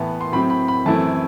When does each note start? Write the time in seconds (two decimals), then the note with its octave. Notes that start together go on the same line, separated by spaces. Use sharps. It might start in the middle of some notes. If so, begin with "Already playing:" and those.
Already playing: A2 E3 B3 A5
0.21 C6
0.32 A2 F#3 C4 B5
0.50 B5
0.68 B5
0.86 F#2 E3 A3 C4 E4 A5